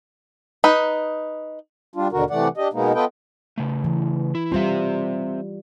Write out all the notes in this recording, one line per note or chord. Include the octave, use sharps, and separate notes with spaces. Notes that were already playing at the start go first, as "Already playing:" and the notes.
D#4 B4
G3 D4 F4
D#2 B2 D3 F#4 A#4
C3 E3 A3 D5 F#5
D4 G4 D#5
B2 G#3 A#3 B3 D#4
B3 F4 A4 B4 D#5 G5
C#3 A3
E3
E4
G3 C4 F4 C5 E5